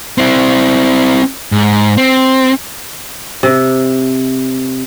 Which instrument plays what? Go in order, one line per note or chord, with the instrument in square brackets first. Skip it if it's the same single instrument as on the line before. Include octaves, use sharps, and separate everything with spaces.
[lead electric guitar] C4 E4
G#2
C4
[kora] C3